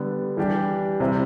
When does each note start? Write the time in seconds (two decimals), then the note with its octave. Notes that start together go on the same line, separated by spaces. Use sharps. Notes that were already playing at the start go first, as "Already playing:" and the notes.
Already playing: D3 G3 B3
0.37 E3 G3 D4 G4
1.00 C3 G3 C4 E4